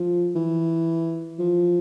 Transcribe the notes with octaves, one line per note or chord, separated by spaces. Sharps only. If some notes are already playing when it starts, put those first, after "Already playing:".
Already playing: F3
E3
F3